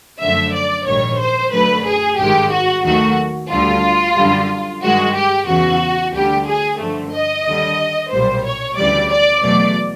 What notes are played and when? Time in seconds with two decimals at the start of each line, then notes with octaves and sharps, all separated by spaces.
0.21 F#2 D3 F3 A3 E5
0.54 D5
0.86 A#1 G#2 D#3 G3 C#5
1.19 C5
1.53 F#2 D3 F#3 A3 B4
1.86 G#4
2.19 G#1 G2 D#3 G#3 G4
2.52 F#4
2.84 D#2 D#3 F#3 A3 F#4
3.50 D2 D3 G3 F4
4.16 F#2 D3 G3
4.82 G2 D#3 G#3 F#4
5.15 G4
5.48 E2 C#3 E3 F#4
6.14 D2 D3 G3 G4
6.47 G#4
6.80 G2 D3 F3 A3
7.13 D#5
7.46 D#2 D3 G3
8.11 B1 A#2 G3 C5
8.45 C#5
8.77 D2 C#3 E3 G3 D5
9.10 D5
9.44 E2 B2 F#3 A3 D5